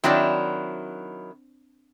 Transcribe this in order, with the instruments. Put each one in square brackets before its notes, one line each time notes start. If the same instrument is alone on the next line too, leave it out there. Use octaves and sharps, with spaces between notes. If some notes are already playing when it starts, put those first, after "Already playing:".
[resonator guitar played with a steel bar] D#3 F#3 E4 [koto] C4 D4